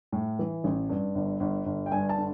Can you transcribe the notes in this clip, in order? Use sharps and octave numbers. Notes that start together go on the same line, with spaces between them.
A2
E3
A1
G2
G1
G1
G1
G5
G2 G#5
A5
D3